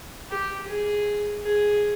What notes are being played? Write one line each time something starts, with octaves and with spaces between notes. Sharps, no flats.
G4
G#4
G#4